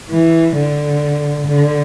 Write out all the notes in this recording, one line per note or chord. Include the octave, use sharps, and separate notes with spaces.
E3
D3
D3